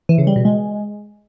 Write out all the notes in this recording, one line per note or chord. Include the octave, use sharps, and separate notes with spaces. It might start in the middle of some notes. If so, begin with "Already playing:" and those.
E3
C#3
G3
B2
G#3